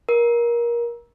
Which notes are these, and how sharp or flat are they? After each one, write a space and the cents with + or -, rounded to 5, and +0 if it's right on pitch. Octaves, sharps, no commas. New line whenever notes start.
A#4 +25